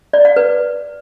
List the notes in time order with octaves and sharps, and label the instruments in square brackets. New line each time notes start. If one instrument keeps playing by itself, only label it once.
[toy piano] D5
F#5
B4